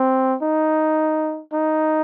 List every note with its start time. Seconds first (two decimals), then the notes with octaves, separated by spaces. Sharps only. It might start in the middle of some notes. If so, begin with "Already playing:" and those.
Already playing: C4
0.42 D#4
1.53 D#4